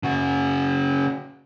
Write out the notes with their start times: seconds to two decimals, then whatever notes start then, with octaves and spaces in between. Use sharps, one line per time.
0.03 C#3 F#4